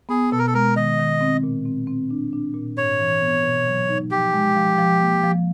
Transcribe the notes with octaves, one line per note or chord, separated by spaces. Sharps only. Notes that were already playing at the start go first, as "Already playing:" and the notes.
B3 G#4
B2 A4
A#4
A4
G#3 A#4
D#3 D#5
D#3
C4
A#2
C4
C4
D4
D4
A#2
G#2 C#5
E3
B3
B2
F#3
D#4
F3 G4
G#3
F3
F3
A#3
F3